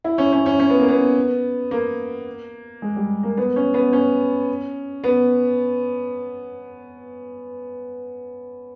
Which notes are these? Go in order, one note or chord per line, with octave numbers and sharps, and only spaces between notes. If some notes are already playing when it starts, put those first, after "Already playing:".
E4
C#4
C#4
C#4
C#4
B3
A#3
B3
A#3
G#3
G3
A#3
B3
C#4
B3
C#4
B3